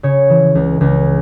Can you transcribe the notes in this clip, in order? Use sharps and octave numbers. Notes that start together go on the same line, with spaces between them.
C#3 C#5
E3
C#2
C#2